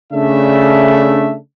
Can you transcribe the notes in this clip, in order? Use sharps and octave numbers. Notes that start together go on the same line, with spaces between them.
C#3 A3 D4 E5